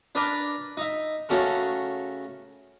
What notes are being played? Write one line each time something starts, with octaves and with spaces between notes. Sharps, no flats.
D4 A#4 B4 D5
D#4 E5
C#3 A3 C#4 F#4 A4 A#4